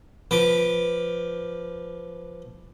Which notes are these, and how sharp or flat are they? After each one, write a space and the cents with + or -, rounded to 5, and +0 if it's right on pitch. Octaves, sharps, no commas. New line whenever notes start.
F3 +0 B4 -5 D6 +5